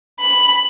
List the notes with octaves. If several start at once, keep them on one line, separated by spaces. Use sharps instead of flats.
B5